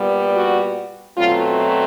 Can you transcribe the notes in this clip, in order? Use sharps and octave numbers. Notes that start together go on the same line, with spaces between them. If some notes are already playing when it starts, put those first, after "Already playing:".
Already playing: A#2 G3 B3
F#4
B2 F#3 A3 C4 F4